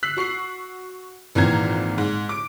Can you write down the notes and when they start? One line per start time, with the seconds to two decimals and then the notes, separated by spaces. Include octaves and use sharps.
0.03 E6 F#6 B6 C7 F#7
0.17 F#4 C#6 C7 F#7
1.35 G#1 A#2 E3 C4 A#5 G#6
1.98 G#2
2.29 D6 D7